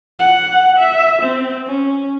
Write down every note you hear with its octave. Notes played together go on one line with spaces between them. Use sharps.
F#5
E5
C4
C#4